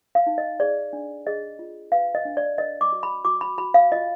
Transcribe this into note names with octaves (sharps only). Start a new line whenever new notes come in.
F5
D#4
D#5
G#4 D5
D4
G#4 D#5
F4
B4 F5
D#5
D4
D5
A#4 D#5
D6
F#4
B5
F#4 D6
B5
F#4 B5
F5
F4 D#5